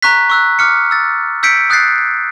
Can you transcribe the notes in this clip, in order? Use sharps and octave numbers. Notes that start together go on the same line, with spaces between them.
A#5 C#6 F#6 B6
C#6 E6 F#6
D6 F6 C#7
E6 A6
E6 G6 B6 C#7 D7
D#6 F#6 G6 A6 C7